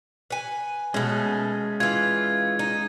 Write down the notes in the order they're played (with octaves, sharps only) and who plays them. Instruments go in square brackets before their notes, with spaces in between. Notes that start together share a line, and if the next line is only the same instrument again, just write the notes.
[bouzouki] B4 G#5
[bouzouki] B2 A3 [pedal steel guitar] G#3 C#4
[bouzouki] E3 F4 [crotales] G#6
[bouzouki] D#4